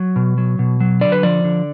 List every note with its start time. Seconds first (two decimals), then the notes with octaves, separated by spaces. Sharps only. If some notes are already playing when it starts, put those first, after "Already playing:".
Already playing: F#3
0.16 B2
0.38 F#3
0.59 B2
0.80 F#3
1.01 D3 D5
1.12 B4
1.23 F3 D5
1.44 D3